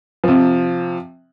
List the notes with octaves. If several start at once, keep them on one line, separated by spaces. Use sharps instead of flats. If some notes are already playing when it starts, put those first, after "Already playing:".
C3 F3